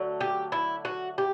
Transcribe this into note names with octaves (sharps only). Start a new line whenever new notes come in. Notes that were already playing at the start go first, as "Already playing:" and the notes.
Already playing: D3 F#3 A3
G4
E4
F#4
G4